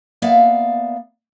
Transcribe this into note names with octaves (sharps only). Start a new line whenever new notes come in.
A#3 B3 D5 E5 F5